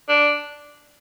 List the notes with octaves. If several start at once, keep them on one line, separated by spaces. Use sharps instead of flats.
D4